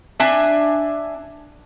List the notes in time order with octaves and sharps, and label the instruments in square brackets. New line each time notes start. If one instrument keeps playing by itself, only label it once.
[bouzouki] D4 E5 G#5